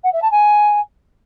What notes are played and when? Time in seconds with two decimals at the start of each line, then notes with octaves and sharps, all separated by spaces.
0.04 F#5
0.13 E5
0.22 A5
0.32 G#5